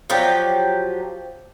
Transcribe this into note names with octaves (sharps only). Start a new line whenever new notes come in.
F3 F#3 G4